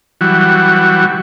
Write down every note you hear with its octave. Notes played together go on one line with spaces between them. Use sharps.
E3 F#3 G3 F#4